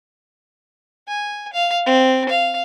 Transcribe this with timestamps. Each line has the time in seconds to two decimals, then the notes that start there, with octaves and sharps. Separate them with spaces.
1.08 G#5
1.53 F5
1.86 C4
2.29 F5